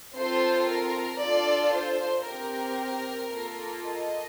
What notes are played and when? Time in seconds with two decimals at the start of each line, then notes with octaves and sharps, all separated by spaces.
0.16 C4 F4 A4 C5
0.69 A#4
1.21 D4 F4 A4 D5
1.74 C5
2.27 C4 G4 A#4
3.32 A#3 F4 A4
3.85 D#5